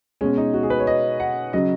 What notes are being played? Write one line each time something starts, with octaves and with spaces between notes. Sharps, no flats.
B2 G#3 C#4
D#4
F#4
G#4
B4
C#5
D#5
F#5
C#3 F#3 D#5